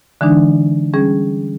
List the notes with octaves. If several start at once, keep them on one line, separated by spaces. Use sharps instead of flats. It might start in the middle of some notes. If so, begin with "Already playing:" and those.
D3 E3 G#3 D4 D#4
G3 C#4 G#4